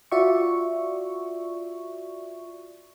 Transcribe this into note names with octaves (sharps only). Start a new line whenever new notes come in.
F4 F#4 D5 E5 C#6